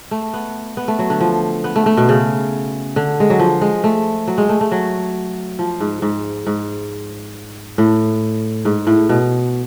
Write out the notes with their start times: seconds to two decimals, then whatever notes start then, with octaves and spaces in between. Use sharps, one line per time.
0.11 A3
0.33 B3
0.77 B3
0.88 A3
0.99 F#3
1.10 D3
1.20 F3
1.64 B3
1.76 A3
1.86 A3
1.97 B2
2.09 C#3
2.96 D3
3.20 G#3
3.30 F#3
3.39 F3
3.61 G#3
3.84 A3
4.27 F#3
4.38 G#3
4.49 A3
4.61 A3
4.72 F#3
5.59 F3
5.80 G#2
6.02 G#2
6.46 G#2
7.78 A2
8.65 G#2
8.87 A2
9.09 B2